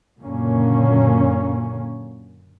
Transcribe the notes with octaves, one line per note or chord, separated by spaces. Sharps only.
F#1 F#2 A#2 D3 A#3 C#4